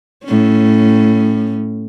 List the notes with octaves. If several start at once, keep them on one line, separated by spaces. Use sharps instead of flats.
A2 C#4